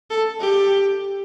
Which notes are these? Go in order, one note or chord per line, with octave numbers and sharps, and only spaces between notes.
A4
G4